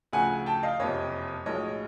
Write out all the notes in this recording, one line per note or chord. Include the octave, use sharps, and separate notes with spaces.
D2 C#3 F3 F#5 G#5
G5 A5
D#5 F5
F#1 F2 C3 C#5 D#5
B1 A2 F3 G#3 C#5 D#5